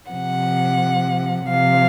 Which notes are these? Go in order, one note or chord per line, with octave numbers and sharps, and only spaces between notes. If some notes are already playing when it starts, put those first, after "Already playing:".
C3 F3 F#5
C3 F3 F5